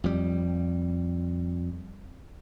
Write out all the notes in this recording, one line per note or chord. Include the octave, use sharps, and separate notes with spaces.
F2 G3